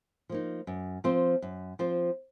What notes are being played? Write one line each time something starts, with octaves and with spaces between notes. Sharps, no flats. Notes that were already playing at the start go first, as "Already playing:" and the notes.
F3 A#3 D#4
F#2
F3 C4 F4 C5
F#2
F3 C4 F4 C5